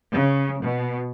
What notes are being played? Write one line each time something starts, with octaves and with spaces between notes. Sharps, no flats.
C#3
B2